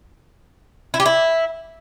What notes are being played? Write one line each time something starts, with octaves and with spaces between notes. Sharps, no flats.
E4
G4
E4